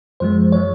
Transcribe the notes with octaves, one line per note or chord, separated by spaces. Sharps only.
F#2 F3 G#3 C5
F3 G#3 C#5